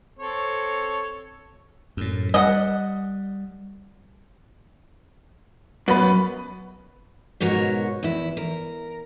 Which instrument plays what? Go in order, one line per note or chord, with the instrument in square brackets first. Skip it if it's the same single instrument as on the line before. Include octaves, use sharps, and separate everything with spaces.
[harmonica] C4 A4 C#5
[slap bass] F#2 A2
[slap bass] G3 [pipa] D#5 F#5
[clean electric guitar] F#2 [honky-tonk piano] B3 B4
[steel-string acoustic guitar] G#2 B2 F#4 A#4 C#5
E2 E4
A#4